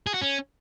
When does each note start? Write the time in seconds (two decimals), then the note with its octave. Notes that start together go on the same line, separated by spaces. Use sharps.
0.07 G#4
0.14 F#4
0.22 C#4